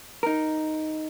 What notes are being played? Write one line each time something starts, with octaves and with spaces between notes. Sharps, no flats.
D#4 A#4